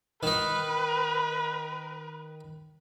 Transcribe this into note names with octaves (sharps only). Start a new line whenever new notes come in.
D#3 D#4 B4